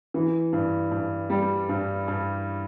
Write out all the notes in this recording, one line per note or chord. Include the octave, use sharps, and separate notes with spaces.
E3
G2
G2
G3
G2
G2